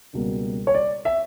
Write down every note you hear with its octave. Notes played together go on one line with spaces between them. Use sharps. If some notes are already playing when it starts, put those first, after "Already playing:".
C#2 B2 G3 A#3
C#5
D5
E5